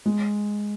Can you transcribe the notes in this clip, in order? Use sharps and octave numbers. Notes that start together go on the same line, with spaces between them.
G#3